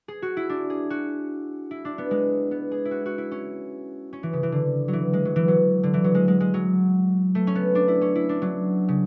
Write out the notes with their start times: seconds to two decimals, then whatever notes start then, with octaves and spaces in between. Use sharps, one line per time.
0.08 G#4
0.22 F#4
0.37 E4
0.50 D4
0.70 G#4
0.90 F#4
1.71 E4
1.85 D4
1.98 B3
2.11 G#3
2.51 B3
2.72 G#4
2.85 E4
2.91 F#4
3.06 F#4
3.18 E4
3.31 C#4
4.13 C#4
4.23 E3
4.33 C#3
4.43 E3
4.52 D3
4.88 F#3
4.93 E3
5.13 G#3
5.25 F#3
5.36 E3
5.48 F#3
5.83 D3
5.94 E3
6.04 F#3
6.15 G#3
6.28 G#3
6.40 G#3
6.54 F#3
7.35 A3
7.47 C#4
7.55 B3
7.75 D4
7.88 E4
8.01 C#4
8.15 E4
8.29 D4
8.42 F#3
8.88 C#3